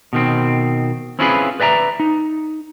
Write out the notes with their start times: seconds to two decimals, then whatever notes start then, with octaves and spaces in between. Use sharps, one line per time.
0.13 B2 D#3 C4
1.19 C4 C#4 E4 F4 G#4 B4
1.60 B4 D5 E5 G#5 A#5
2.00 D#4